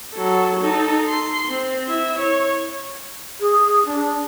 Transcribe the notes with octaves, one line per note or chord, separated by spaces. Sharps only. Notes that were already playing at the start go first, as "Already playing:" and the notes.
F#3 A4
D#4 A4
C6
C4
E4 E5
C#5
G#4
D4